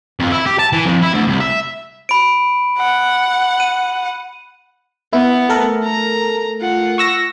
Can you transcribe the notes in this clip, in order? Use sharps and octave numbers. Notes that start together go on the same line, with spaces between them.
F2
E4
G4
A5
E3
F2
E4
D2
C2
E5
B5 D7
F#5
D#7
B3 E4
A3 A4 A#4
A#5
F4 F#5
C#6 E6 A#6